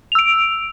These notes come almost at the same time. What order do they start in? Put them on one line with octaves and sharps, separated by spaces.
F7 E6 D7